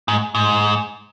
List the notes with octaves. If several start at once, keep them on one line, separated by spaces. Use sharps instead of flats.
G#2
G#2